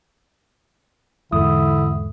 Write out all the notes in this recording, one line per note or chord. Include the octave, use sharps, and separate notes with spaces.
E2 G#2 D3 E4 D#6